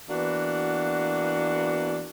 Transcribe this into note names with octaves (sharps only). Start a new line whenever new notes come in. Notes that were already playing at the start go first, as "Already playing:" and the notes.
E3 A#3 B3 D4 F#4